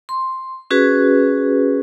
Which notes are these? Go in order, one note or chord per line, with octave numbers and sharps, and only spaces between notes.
C6
C#4 F#4 G#4 B4